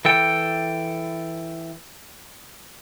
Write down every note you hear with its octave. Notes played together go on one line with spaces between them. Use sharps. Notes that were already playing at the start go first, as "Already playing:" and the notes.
E3 A4 G5